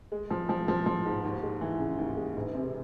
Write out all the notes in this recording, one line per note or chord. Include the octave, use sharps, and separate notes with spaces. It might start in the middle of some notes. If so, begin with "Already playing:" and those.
G#3
F3
F3
F3
F3
G#2
D#2
G#3
E3
C#3
D#2
G#3
E1
C3